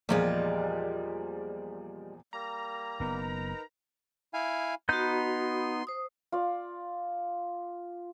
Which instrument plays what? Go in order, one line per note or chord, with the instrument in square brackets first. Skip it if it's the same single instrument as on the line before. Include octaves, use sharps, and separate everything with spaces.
[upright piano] E2 A#2 F3 [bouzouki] G3 G#3 F4
[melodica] G3 A#3 [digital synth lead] A#5
[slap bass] F#1 B3 [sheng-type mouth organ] D#4 A#4 B4
[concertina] E4 F5 G#5
[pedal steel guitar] B3 D#4 G6 [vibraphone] F#4 B5 [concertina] C6
[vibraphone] C5 D#6
[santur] F4 D5